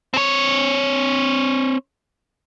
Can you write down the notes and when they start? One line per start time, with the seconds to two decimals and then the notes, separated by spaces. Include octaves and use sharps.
0.14 C4 C#5